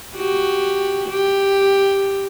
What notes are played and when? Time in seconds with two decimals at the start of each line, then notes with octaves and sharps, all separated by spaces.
0.17 F#4 G4
1.09 G4